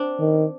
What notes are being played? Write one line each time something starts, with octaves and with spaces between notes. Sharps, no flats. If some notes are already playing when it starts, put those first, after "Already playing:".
Already playing: C4 D4
D#3